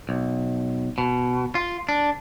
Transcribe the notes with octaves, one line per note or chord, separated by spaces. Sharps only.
B1
B2
F4
D4